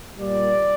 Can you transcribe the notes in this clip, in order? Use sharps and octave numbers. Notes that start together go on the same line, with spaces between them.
A#2 G3 D5